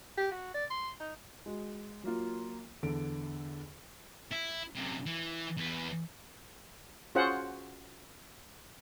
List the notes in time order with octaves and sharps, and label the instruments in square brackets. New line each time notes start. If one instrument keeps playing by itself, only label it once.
[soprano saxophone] G4
F#4
D5
C6
D#4
[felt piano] G#3 F#4
F#3 A#3 F4
E2 D3 A4 D7
[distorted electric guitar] E4
F#2 C3
E3
E2 B4
[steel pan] C#4 F4 F#4 G#4 C5 F#5